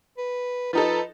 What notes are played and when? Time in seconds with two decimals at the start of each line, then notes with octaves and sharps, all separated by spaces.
0.18 B4
0.73 F3 D#4 A4 B4